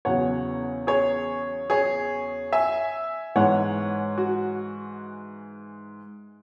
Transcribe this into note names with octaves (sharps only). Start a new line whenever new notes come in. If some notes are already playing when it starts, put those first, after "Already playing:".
E2 C#3 F#3 C#5 F#5
G#4 C#5
G#4 C#5
E5 G#5
G#2 E3 G#3 C#5 F#5
F#4